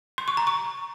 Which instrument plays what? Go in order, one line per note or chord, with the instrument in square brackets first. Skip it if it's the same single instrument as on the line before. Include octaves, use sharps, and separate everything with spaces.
[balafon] C6
C#6
A#5
C#6